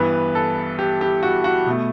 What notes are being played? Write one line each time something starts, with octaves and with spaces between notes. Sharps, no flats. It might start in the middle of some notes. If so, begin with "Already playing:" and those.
Already playing: G2 E3 B3 B4
A4
G4
G4
F#4
F#4
B2 A3